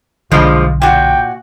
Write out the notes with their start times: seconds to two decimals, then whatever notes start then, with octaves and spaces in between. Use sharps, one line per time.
0.31 B1 G2 D3 F3 F#3 G#3 F4
0.82 A#2 F#4 G5